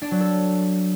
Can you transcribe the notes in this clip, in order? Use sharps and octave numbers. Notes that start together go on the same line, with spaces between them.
D4
F#3
A4